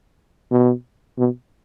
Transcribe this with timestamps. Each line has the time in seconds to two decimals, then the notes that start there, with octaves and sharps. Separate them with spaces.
0.51 B2
1.18 B2